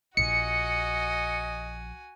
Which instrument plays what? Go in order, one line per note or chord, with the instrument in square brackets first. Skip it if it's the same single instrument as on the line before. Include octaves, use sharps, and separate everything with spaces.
[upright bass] A#1 [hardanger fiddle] F#4 G#5 [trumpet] D#5 [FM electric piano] C#7